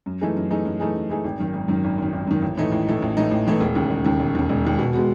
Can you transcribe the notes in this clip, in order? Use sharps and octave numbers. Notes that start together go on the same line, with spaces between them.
F#2
E3 A3 D#4 G#4
F#2
E3 A3 D#4 G#4
F#2
E3 A3 D#4 G#4
F#2
E3 A3 D#4 G#4
G#1
F#2 D#3
G#1
F#2 D#3
G#1
F#2 D#3
G#1
F#2 D#3
A1
A2 E3 A3 D#4
A1
A2 E3 A3 D#4
A1
A2 E3 A3 D#4
A1
A2 E3 A3 D#4
E1
D#2 C#3
E1
D#2 C#3
E1
D#2 C#3
E1
D#2 C#3
B2
G#3 B3 F#4